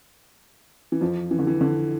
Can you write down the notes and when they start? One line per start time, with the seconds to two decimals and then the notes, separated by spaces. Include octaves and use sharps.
0.92 E3
1.01 F2 F3
1.31 E3
1.39 D3
1.47 E3
1.61 D3